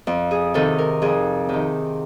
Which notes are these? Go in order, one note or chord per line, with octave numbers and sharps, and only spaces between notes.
F2
G#4
C3 D#3 A4
A#4
F2 G#4
C3 D#3